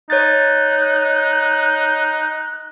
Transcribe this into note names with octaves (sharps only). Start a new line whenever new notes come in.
D#4 C#5 F#6 A6